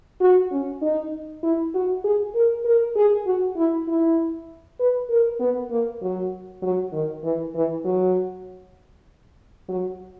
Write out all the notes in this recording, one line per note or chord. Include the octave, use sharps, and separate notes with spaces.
F#4
C#4
D#4
E4
F#4
G#4
A#4
A#4
G#4
F#4
E4
E4
B4
A#4
B3
A#3
F#3
F#3
D#3
E3
E3
F#3
F#3